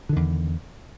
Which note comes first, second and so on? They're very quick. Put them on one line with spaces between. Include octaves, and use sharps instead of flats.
D3 D#3 E2